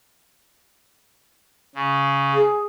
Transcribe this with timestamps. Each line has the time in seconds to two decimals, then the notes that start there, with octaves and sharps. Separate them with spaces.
1.75 C#3
2.34 G#4